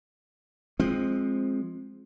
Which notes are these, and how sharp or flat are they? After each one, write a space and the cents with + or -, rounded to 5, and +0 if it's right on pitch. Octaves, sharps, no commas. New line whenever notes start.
F3 +5 G#3 +0 C4 +15